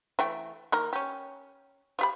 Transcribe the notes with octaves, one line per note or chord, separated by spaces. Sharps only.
E3 A3 G5
D#3 A#3 A#4
C#4 G4
F3 G4 B5